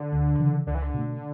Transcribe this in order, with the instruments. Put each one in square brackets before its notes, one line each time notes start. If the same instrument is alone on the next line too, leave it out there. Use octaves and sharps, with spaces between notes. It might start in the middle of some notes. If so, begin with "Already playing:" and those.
Already playing: [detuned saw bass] D3
[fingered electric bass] D2
C#3 E3
[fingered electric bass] C#2 [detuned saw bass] D3
[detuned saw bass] E3
D3
[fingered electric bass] B2 A3